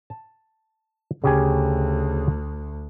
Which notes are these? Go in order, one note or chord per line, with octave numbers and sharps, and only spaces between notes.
A5
D2 C#3 G4 G#5